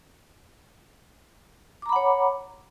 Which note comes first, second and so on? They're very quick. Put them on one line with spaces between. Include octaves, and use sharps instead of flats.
D6 A#5 B5 F#5 C#5